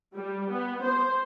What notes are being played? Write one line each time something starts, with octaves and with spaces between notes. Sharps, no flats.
G3
B3
C5